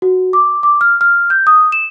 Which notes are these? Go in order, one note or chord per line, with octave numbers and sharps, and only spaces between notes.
F#4
D6
D6
F6
F6
G6
D#6
E7